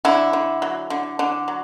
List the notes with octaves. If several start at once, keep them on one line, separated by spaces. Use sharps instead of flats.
D3 E4
D3
F#3
D3
D3
F#3